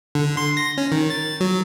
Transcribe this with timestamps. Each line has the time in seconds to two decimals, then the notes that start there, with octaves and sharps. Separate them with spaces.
0.15 D3
0.37 C6
0.57 A#6
0.78 C#4
0.92 D#3
1.10 A6
1.41 F#3